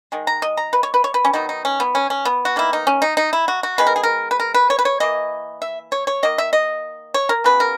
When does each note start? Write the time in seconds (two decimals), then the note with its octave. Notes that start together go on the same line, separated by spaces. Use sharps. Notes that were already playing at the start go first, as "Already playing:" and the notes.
0.12 D#3 G#3
0.27 A#5
0.42 D#5
0.57 A#5
0.73 B4
0.83 C#5
0.94 B4
1.04 C#5
1.14 B4
1.25 C#4
1.33 D#3 F#3 B3 D#4
1.49 D#4
1.65 C#4
1.80 B3
1.95 C#4
2.10 C#4
2.25 B3
2.45 F#4
2.56 D#3 A#3 E4
2.73 D#4
2.87 C#4
3.02 D#4
3.17 D#4
3.33 E4
3.48 F#4
3.63 F#4
3.78 D#3 G#3 B3 B4
3.87 A#4
3.96 G#4
4.03 A#4
4.31 B4
4.40 A#4
4.54 B4
4.70 C#5
4.79 B4
4.85 C#5
5.00 E3 A#3 D#5
5.62 E5
5.92 C#5
6.07 C#5
6.23 D#3 A#3 D#5
6.38 E5
6.53 D#5
7.14 C#5
7.29 A#4
7.44 C#3 F#3 B3 B4
7.60 A#4